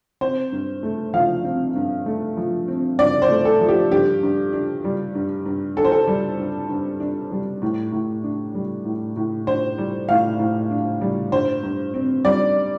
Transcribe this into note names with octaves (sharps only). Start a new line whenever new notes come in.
C4 C5
G2
A3
F3 F5
C4
G2
A3
F3
C4
G2 D5
C5
A3
A4
F3
G4
G2 G4
G2
D4
G3
G2
G2
D4 A4
C5
A4
G3
G2
G2
D4
G3
A2
A2
D4
G3
A2
A2
D4 C5
G3
A2 F5
A2
D4
G3
G2 C5
G2
C4
G3 D5